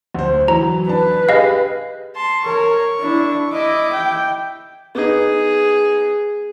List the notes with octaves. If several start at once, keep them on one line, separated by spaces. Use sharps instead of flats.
D2 C5
E3 F#3 A#5
D4 B4 A5
G4 G#4 D#5 F5
A5 C6
A#4 C#5 C#6
D4 E4
E4 D#5 D6
G5
B3 D#4 G#4